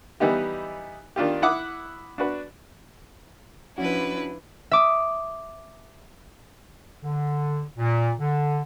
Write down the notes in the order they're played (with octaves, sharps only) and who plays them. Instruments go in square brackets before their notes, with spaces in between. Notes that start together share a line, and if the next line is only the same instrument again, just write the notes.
[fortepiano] E3 G3 B3 D#4 G4
D#3 D4 F4 G4
E4 F#5 D6 D#6
D4 F#4 B4
[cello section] F3 D4 [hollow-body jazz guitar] C#4 F#4 [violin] E4 B4
[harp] E5 D6 D#6
[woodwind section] D3
A#2
D3